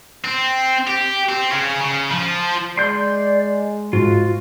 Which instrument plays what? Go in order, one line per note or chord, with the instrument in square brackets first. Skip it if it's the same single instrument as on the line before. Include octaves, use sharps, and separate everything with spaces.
[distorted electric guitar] C4
G4
C4
C#3 C#4
C#3
F3
[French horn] G#3 [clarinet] D5 [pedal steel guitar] C6 G6
[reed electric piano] G#2 [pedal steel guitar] F4 [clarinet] F#4